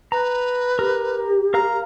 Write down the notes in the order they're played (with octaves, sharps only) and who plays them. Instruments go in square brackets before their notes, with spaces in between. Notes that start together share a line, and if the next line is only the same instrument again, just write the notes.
[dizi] B4 [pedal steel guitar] A#5
[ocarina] G4 [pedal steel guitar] A#4
[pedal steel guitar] A#4 F5 F6 [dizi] A#5